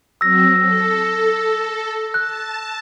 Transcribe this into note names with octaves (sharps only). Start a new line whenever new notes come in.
F#3 C4 E6 A#6
A4
A5 F#6